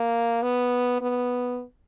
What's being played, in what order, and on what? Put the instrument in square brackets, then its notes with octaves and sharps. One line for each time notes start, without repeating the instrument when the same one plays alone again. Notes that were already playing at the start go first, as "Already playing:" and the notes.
Already playing: [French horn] A#3
B3
B3